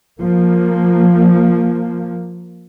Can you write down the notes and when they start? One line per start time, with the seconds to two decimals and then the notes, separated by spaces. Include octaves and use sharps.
0.20 F3 A#3